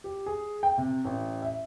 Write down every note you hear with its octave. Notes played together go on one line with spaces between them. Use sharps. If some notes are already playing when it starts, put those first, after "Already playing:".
G4
G#4
G5
C3
A1
E5